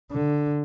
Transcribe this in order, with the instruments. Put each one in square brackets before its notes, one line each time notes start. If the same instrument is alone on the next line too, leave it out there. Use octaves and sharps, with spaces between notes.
[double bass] D3